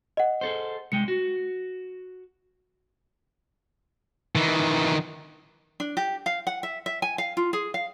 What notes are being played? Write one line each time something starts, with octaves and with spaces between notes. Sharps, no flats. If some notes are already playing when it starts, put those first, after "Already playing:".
D#5 F#5
G#4 A4 C5
C2 G#3 G5 C#7
F#4
D#3 E3
D4
G4
F5
F#5
E5
E5
G#5
F5
F4
G#4
F5